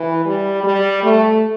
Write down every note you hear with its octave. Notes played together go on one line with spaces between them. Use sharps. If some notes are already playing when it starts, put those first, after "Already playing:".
Already playing: E3
G3
G3
A3